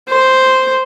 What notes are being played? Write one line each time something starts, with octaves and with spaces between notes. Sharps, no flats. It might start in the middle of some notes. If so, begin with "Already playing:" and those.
C5